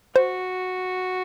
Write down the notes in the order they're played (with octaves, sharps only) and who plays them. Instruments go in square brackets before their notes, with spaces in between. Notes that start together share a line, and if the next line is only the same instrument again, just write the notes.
[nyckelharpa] F#4 [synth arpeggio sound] C5